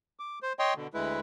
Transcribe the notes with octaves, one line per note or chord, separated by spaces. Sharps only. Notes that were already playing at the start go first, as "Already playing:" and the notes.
D6
C5
C#5 D#5 G5 C6
B2 D3
D2 G#3 E4 B4